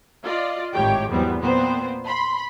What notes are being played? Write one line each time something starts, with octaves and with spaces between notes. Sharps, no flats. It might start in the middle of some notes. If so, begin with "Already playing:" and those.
F4 D5 D#5
G#1 A2 D#3 G4 C#5 G5
E2 G#2 F#3 G3 B3 C4
A#2 B3 C4 C5
B5 C6